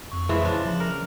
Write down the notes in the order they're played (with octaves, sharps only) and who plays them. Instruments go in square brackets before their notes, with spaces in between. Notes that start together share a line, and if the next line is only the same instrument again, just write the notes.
[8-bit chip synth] F2 C#6
[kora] E3 F3 G#3
C#3 D4
[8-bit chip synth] F3
[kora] A#4